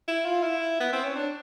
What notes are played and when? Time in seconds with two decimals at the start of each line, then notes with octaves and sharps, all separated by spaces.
0.08 E4
0.26 F4
0.43 E4
0.80 B3
0.93 C4
1.04 C#4
1.17 D4